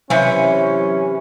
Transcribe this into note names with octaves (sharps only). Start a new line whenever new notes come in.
C3 E3 F#3 C#4 E5 C#7